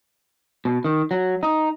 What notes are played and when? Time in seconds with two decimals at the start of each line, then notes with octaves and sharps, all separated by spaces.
0.65 B2
0.85 D#3
1.11 F#3
1.43 D#4